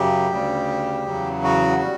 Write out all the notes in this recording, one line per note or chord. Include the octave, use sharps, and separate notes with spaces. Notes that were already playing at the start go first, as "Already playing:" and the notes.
Already playing: F#2 C#3 F#3 G4
D2 C#3 G3
E2 C#3 F#3
F#4
G3